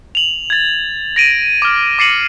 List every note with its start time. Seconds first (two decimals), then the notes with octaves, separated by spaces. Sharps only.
0.15 F7 F#7
0.50 G#6 A6
1.16 A#6 D7 D#7
1.62 D6 F6
1.99 D6 A6 C7 C#7 D#7 F#7